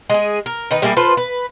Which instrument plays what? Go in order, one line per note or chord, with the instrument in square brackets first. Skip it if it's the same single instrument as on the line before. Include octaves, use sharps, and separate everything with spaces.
[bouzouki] G#3 G#4
A#4
D#3 D#4 B4
G3 A#3 E4 G#4
F4 A4 B4 C5
B4